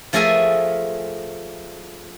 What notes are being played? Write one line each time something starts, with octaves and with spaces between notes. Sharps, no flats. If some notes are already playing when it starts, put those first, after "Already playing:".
F3 A3 G#4 A#4 E5 G#5